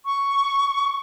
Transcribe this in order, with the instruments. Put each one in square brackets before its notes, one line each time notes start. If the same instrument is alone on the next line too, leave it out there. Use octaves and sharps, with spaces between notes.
[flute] C#6